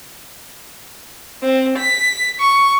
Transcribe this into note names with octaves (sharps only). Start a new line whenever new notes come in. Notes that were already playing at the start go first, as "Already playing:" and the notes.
C4
B6
C#6